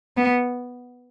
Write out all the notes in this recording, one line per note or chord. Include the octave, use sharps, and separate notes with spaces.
B3